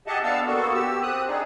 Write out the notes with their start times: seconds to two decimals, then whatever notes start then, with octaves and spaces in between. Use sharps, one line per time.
0.07 G4 G#4 D#5 E5 F#5 A5
0.23 B3 D4 F5 A5 E6
0.46 A#3 B3 F#4 A4
0.74 G4 E6
1.02 C4 D#6 F#6
1.27 D4 D#4 G#4